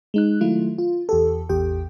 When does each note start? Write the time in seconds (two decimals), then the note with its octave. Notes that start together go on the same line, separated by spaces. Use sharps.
0.14 G#3 D#4 F#6
0.41 D#3 F#3 A3 E4 F4
0.78 F4
1.09 E2 G4 A4
1.49 A1 E2 G4 G5